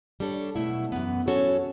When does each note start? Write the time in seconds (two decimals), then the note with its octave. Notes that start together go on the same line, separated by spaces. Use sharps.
0.20 G3 D4 A4 C#5
0.56 B2 F#3 A3 E4
0.92 F#2 E3 B3
1.27 F#3 C#4 F#4 A4 C#5